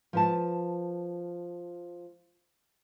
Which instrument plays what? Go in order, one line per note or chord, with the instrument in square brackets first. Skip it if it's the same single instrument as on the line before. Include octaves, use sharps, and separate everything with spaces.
[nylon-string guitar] F3 B4 A5